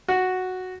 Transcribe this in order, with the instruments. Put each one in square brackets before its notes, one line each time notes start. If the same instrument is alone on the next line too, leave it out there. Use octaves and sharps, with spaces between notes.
[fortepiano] F#4